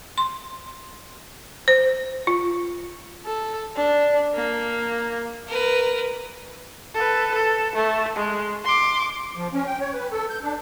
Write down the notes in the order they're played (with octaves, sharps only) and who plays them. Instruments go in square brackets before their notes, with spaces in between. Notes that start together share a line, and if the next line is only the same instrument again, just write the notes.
[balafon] C6
C5
F4
[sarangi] A4
D4
A#3
[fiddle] A#4 B4
[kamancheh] A4 B4
A4
A3
G#3
C6 D6
[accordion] F3
C#4
G5
C#5
B4
A4
G6
D4